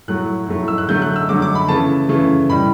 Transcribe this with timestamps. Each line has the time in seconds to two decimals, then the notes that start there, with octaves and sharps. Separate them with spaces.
0.08 A2 F#3 A3 F#6
0.48 A2 F#3 A3
0.68 E6
0.78 F#6
0.88 D3 F#3 A3 G6
1.02 F#6
1.16 E6
1.29 D3 F#3 A3 D6
1.42 D6
1.55 B5
1.69 C#3 E3 A3 A5
2.09 C#3 E3 A3
2.49 A2 G3 B5